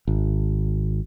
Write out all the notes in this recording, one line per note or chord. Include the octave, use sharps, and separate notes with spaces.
G#1